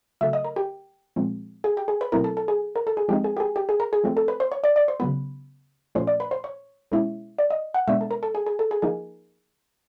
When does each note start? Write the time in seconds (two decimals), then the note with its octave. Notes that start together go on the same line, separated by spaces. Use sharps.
0.21 C#3 F#3 A3 E5
0.33 D#5
0.45 A#4
0.56 G4
1.16 A#2 F3 G#3 C4
1.64 G#4
1.77 G4
1.88 G#4
2.01 B4
2.12 B2 F#3 A3 C4 E4 A#4
2.24 A4
2.37 A4
2.48 G#4
2.76 A#4
2.87 A4
2.97 G#4
3.09 F3 G#3 C4 D#4 G4
3.24 G#4
3.37 G4
3.40 G#4
3.56 G4
3.69 G#4
3.80 A#4
3.93 G#4
4.04 F3 A3 C4
4.17 A4
4.28 B4
4.40 C5
4.52 C#5
4.64 D5
4.76 D5
4.88 C5
5.00 C#3 F#3 B3 B4
5.95 A#2 F3 A3 C#4 C5
6.07 D5
6.20 B4
6.31 C5
6.44 C#5
6.92 B2 G#3 C#4 E4
7.38 D5
7.50 D#5
7.74 F#5
7.88 B2 G#3 B3 D4 E5
8.01 A4
8.11 A#4
8.23 A4
8.35 G#4
8.46 G#4
8.59 A4
8.71 G#4
8.82 F3 A#3 D#4 G#4